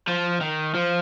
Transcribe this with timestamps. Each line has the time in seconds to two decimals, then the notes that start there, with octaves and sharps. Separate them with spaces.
0.08 F3
0.41 D#3
0.74 F3